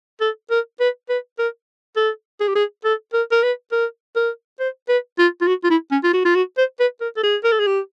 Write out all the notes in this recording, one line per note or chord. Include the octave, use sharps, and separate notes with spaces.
A4
A#4
B4
B4
A#4
A4
G#4
G4
G#4
A4
A#4
A#4
B4
A#4
A#4
C5
B4
F4
F4
F#4
F4
E4
C#4
F4
F#4
F4
F#4
C5
B4
A#4
A4
G#4
A#4
A4
G#4
G4